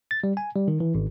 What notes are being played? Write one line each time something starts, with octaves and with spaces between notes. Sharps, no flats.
A6
G3
G#5
G3
D#3
E3
G#1